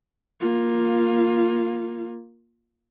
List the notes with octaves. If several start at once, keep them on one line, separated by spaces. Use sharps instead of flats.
A#3 F4